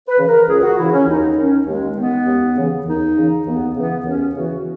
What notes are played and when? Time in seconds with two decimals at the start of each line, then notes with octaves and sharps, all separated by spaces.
0.08 B4
0.19 C#3 E3
0.28 A#4
0.48 C#2 G#4
0.63 F#4
0.77 C#3 E3 E4
0.92 C#4
1.07 D#2 D#4
1.37 D#3 C#4
1.67 D#2 G#3
1.97 D#3 B3
2.26 D#2
2.57 C#3 E3
2.86 D#2 D#4
3.17 C#3 E3
3.47 D#2 B3
3.76 C#3 E3 B3
4.05 D#2 C#4
4.35 C#3 E3 F#4